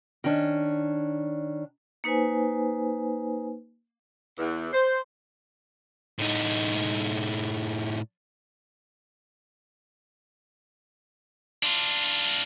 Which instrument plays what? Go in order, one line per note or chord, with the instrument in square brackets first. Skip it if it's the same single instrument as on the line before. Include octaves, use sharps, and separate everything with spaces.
[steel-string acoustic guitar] D#3 C#4 D4
[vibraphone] A#3 D#4 B4 C5 G#5
[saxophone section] E2
C5
[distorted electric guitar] A2 D#4
D4 F4